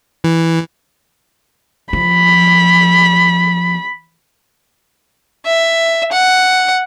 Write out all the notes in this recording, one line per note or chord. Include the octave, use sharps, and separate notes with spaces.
E3
F3 B5
E5
F#5